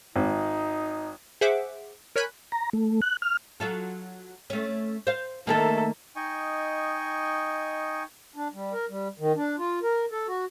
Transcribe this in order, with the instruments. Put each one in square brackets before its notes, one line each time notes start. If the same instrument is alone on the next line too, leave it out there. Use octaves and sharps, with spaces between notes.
[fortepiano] G#1 [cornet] D#4
[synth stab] G#4 C5 E5 F#5 D6
A#4 C#5 G#5 B5 F#6
[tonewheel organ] A#5
A3
F#6
F6
[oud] F#3 F4 A4
A3 C#4
C5 F5
[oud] D#3 A3 A#3 [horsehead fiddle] A4 E5
[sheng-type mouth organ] D#4 D#5 G5 G#5 C#6
[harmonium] D4
G3
A#4
G3
D#3
D4
F4
A#4
A4
F#4